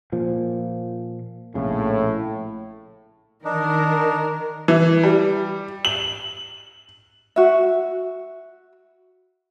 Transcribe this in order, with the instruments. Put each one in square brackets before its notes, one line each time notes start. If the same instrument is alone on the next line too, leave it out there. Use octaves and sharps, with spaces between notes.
[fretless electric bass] A#2 F3
[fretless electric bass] A#1 C#3 [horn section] A2
[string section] D#3 A#4 [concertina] D4 D#4
[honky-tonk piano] E3
G3
F#7
[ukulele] F#4 E5